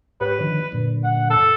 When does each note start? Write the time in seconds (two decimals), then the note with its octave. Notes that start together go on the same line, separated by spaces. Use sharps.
0.21 G#2 G4 B4 C#5
0.40 D3 D#3 F3
0.72 F#2 A#2 D3
1.04 F#5
1.30 A4